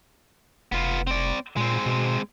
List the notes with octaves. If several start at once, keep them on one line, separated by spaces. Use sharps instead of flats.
F1 B3 F4
C4 D5
A#2 G#3 C4
B2